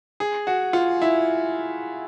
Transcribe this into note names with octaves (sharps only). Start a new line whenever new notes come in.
G#4
F#4
F4
E4